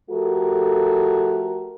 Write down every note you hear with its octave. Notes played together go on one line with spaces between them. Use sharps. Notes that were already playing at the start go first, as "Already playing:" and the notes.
F3 A3 F#4 G4 A4 A#4